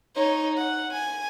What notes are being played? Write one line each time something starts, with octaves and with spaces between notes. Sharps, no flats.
D#4 C#5
F#5
G#5